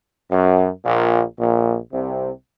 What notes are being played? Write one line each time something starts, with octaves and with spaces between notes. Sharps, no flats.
F#2
A#1 A#2
A#1 A#2
C2 C3